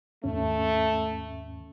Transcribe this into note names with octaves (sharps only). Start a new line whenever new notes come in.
D#2 G#2 A3 C#4